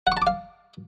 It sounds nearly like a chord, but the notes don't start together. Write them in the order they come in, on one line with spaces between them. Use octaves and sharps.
F#5 C#6 A5 D6 F5